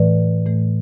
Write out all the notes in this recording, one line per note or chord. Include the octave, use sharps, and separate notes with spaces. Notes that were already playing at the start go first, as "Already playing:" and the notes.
Already playing: A2 E3 A3 B4 D5
A2 E3 A3